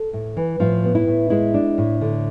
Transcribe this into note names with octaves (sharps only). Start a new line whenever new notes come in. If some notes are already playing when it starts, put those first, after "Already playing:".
Already playing: A4
A2
E3
A2 F3 F4
B3
E4
A2
G#3 E4
D4
A2
D3